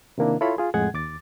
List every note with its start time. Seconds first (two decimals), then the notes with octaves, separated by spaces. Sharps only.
0.18 C3 D#3 A#3 D4 E4
0.41 E4 F4 A4 C#5 B5 C6
0.58 F4 G#4
0.74 F2 A2 G#3 G#4 F#5 G#6
0.94 D#2 D6 A6